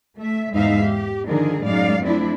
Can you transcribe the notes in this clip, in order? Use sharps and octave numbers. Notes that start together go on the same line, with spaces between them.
A3 E5
E2 G#2 G#3 D#4 E5 F5
G4
D3 D#3 F3 D4 G#4 A#4
F#2 A2 G#3 D#4 D5 F5
F3 A3 C4 D4 E4